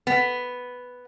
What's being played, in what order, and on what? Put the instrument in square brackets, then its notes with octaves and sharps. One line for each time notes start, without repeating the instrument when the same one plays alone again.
[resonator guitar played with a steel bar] B3